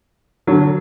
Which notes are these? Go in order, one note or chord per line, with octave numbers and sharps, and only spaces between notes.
D3 F#3